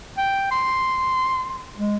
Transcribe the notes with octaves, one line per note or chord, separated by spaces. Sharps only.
G5
C6
G#3